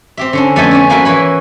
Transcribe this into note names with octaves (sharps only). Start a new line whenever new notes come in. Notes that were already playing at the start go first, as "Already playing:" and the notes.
C4 G4 E5
D3 C#4 D4
F2 A3 B3 D5 E5 G#5
C#4 C#5 D5
F3 A#3 F#4 A#4 B4 E5
E3 A#3 B4 C#5 B5